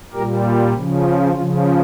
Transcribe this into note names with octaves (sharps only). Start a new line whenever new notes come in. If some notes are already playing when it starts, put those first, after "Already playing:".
A#2 G3 G4 A#4
C#3 F3
C#4 F4
C#3 F3 C#4 F4